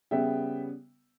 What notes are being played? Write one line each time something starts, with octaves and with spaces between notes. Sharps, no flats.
C#3 G3 B3 E5 G5